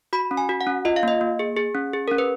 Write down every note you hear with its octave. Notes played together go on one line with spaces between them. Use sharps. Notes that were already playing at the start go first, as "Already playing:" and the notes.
F#4 B5
C#4
G#5
F#4
F#5
C#4
F4 D#5
F5
A#3 D#5
A#3
G#4
G#4
C#4
G#4
C#4 A#4
B4